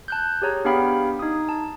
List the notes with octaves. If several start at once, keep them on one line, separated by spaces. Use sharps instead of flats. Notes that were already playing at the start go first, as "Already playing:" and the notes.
A5 F#6 G6
G4 G#4 C#5 A#5
B3 D4 G4 F5 G5 B5
D#4 D#6
A5